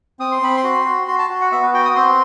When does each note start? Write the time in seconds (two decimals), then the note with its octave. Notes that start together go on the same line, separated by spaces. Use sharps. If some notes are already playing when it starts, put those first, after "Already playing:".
0.19 C4 D#6
0.32 C6
0.42 C4 B5
0.57 C6
0.64 F#4
0.85 F#4
1.07 F#4 C6
1.19 A5
1.30 F#4
1.41 F#5
1.52 B3 E5
1.63 B4
1.74 F#4 G5
1.85 D#6
1.96 C4 C6